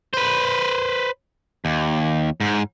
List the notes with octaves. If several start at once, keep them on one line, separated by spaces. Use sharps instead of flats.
B4 C5
D#2
G#2